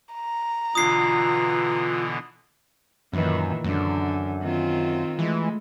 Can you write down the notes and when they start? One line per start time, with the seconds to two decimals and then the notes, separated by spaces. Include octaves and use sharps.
0.14 A#5
0.75 B2 D3 E3 F4 D#6 C7
3.13 F#2 A#2 D#3 E3
3.64 F#2 D3
4.43 D#3 C4 F4
5.19 E3 G#3 A3